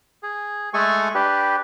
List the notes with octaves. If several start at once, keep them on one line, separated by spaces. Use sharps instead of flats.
G#4
G#3 A3 G#4 A4 G#5 C#6
D4 G4 B4